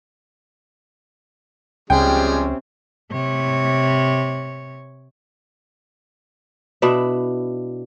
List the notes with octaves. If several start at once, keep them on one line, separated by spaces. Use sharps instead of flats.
C#2 C3 F3 G3 G#3 C4 C#4 G5
C3 C#5
B2 D4 E4 E5